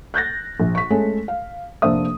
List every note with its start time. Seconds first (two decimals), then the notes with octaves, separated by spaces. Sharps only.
0.14 F#6 G6 A6 A#6
0.60 A#1
0.75 C#6 B6
0.90 G#3 A3 C#4 A4
1.28 F5
1.82 F1 A#3 D4 C5 E5 D#6